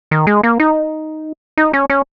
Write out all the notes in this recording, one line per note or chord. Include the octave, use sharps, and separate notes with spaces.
D#3
G#3
A#3
D#4
D#4
C#4
C#4